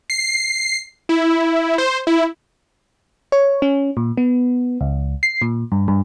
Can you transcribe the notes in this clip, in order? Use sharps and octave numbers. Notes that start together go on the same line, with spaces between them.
C7
E4
C5
E4
C#5
C#4
A#2
B3
C#2
C7
A#2
G2
G2